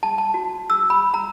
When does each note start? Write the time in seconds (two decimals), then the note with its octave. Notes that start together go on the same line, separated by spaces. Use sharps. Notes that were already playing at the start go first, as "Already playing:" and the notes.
0.03 A5
0.18 A5
0.34 F#4
0.70 E6
0.90 B5
1.14 A#5